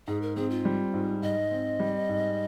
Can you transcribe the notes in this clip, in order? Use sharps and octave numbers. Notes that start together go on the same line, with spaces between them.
G#2 G#4
A#4
C4 G#4
F4
G3
G#2
G#2 D#5
C4
G3
G#2